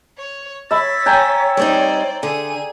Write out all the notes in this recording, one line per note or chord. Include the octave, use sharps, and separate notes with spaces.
C#5
C#5 E5 B5 A6 B6
G5 G#5 A#5
G3 C4 D#4 C5 D5
D3 G#4 D#7